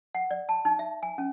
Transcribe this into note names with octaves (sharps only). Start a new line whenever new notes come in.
F#5
D5
A5
D#4
E5
G#5
C#4